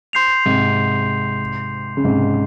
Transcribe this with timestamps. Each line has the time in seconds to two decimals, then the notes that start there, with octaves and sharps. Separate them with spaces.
0.13 C6 G6 C7 F7
0.45 G#2 C3
1.97 C#3
2.05 G#2 C3